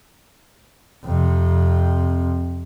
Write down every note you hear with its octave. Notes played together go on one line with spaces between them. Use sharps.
F2 C3